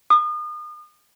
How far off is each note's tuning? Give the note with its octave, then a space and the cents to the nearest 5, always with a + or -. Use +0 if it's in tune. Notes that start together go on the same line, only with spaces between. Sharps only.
D#6 -35